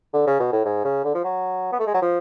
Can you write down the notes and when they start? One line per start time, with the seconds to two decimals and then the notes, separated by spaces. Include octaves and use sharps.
0.13 D3
0.27 C#3
0.39 B2
0.52 A2
0.65 G#2
0.85 C#3
1.04 D3
1.14 F3
1.24 F#3
1.72 B3
1.79 A3
1.87 G#3
1.94 F#3
2.02 F3